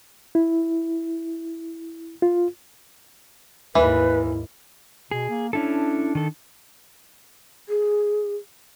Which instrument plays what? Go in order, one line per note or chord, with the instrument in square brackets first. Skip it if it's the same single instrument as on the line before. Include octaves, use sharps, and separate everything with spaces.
[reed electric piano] E4
F4
[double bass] D#2 G#2 [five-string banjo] E3 [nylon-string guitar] E4 [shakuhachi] B4
[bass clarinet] B2 [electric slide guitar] G#4
[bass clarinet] A#3
[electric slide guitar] C#4 E4 A4 [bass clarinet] D4
[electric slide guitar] D#3 A4
[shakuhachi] G#4